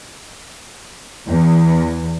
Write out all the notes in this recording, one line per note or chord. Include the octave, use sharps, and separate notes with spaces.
E2